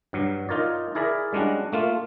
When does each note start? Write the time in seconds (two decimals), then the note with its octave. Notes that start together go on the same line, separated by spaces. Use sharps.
0.13 G2 F#3
0.49 D#4 F4 A#4 C#5 D5
0.95 E4 G#4 A#4 D5 E5
1.33 G3 G#3 C#4 D4 F#4
1.72 A3 A#3 F4